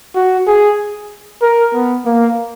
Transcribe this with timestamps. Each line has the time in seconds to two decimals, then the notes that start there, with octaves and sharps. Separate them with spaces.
0.15 F#4
0.47 G#4
1.42 A#4
1.74 B3
2.06 A#3